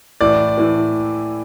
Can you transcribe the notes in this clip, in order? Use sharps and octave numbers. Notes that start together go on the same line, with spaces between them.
A2 E3 D5
A2 E3